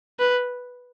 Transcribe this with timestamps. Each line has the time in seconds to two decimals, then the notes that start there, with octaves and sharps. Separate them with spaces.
0.19 B4